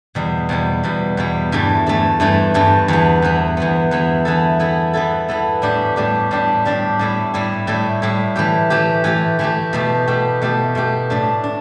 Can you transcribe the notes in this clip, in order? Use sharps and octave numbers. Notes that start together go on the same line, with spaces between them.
E2 B2 G3
E2 B2 G3
E2 B2 G3
E2 B2 G3
G2 E3 A3
G2 E3 A3
G2 E3 A3
G2 E3 A3
E2 E3 B3
E2 E3 B3
E2 E3 B3
E2 E3 B3
E3 B3 E4 A4
E3 B3 E4 A4
E3 B3 E4 A4
E3 B3 E4 A4
A2 G3 D4 G4
A2 G3 D4 G4
A2 G3 D4 G4
A2 G3 D4 G4
A2 G3 E4
A2 G3 E4
A2 G3 E4
A2 G3 E4
E3 A3 G4
E3 A3 G4
E3 A3 G4
E3 A3 G4
B2 A3 G4
B2 A3 G4
B2 A3 G4
B2 A3 G4
A2 A3 D4
D4